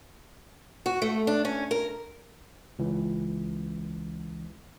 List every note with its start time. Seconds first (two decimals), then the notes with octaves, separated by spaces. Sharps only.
0.86 F#4
1.02 A3
1.27 D4
1.45 C#4
1.71 A#4
2.79 C#2 E3